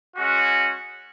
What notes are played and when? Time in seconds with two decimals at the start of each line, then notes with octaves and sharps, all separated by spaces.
0.17 G#3 C#4 F#4